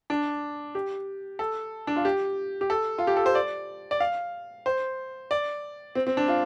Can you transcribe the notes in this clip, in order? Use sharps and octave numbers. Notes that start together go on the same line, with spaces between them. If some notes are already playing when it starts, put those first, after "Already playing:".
D4
G4
A4
D4
F4
G4
G4
A4
F4
G4
A4
C5
D5
D5
F5
C5
D5
C4
C4
D4
F4